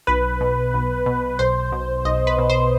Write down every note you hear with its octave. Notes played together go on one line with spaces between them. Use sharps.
B1 B4
B2
B1
B2
B1 C5
B2
B1 D#5
B4
B2
C5